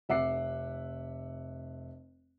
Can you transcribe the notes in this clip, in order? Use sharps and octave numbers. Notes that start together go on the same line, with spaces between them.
F1 E5 F#5 D6 C7